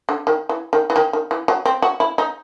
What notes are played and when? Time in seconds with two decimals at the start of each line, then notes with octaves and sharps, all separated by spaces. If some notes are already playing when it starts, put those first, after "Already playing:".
0.09 D3
0.27 D#3
0.49 E3
0.73 D#3
0.90 E3
0.96 D#3
1.13 D#3
1.31 E3
1.48 F#3
1.66 C4
1.82 F#4
2.00 E4
2.18 D#4